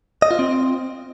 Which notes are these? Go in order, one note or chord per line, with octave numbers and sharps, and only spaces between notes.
D#5
F4
C4